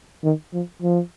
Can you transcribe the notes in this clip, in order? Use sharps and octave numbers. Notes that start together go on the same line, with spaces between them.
D#3
F3
F3